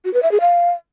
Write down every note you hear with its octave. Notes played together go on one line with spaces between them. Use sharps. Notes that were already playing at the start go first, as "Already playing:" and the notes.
F#4
B4
E5
G#4
F5